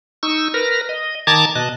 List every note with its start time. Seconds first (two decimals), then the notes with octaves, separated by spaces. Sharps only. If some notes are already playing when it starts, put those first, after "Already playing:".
0.23 D#4 C#6 E6
0.54 A#4 B4 F6 A#6
0.89 D#5
1.27 D#3 A5 A#5 D6 G#6 A6
1.55 B2 D#5 A5 F#6